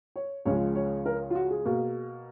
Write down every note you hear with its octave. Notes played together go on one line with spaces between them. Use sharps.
C#5
C#2 C#3 F3 G#3 C#5
C#5
A#4
F4
F#4
G#4
B2 A#3